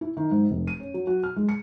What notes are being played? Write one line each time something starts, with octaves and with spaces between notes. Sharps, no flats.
E4
D#3
G#2
F1
D#7
C#4
F#3
F#4
F6
G#3
C#7